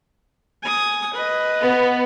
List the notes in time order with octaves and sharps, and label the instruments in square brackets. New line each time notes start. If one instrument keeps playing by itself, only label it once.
[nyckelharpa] G#5 D#6
B4 D#5
[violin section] B3